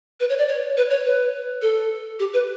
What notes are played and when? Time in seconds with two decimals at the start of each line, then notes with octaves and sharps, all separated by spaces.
0.20 B4
0.29 C#5
0.38 D5
0.48 C#5
0.77 B4
0.90 C#5
1.06 B4
1.62 A4
2.19 G4
2.33 B4